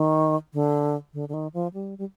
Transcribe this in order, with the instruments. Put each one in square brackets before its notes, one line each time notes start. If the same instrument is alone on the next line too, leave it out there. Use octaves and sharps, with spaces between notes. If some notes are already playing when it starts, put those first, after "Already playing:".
Already playing: [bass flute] D#3
D3
D3
D3
D#3
F3
G3
G3